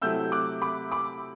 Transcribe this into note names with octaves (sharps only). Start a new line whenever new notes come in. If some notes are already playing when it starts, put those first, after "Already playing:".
C3 F#3 A3 C4 E4 E6 G6
D6 F#6
B5 D6
B5 D6